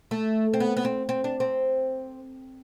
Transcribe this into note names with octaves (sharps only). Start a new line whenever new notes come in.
A3
C4
B3
B3
C4
C4
D4
C4